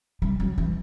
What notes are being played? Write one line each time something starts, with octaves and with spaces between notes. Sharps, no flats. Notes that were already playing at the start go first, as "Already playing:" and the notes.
G3
F#3
E3